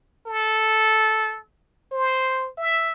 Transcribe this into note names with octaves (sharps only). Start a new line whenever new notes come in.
A4
C5
E5